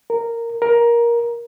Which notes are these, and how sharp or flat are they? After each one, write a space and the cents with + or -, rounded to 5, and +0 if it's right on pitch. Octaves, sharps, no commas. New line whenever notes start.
A#4 -10
A#4 +15